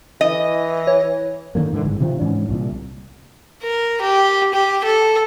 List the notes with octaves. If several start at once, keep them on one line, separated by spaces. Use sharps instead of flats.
E3 D#5
C#5
D3 D#3 G#3 A#3
G#2 D3 E3
G1 G#2
C3 D#3 F3 C4
G#2 E3 C#4 D4
C2 A#2
A#4
G4
G4
A4